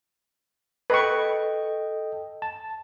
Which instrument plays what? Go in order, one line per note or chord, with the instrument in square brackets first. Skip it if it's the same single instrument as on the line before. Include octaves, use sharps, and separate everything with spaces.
[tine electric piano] A4 D#5 G5 [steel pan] B4 C#6
[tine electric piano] A5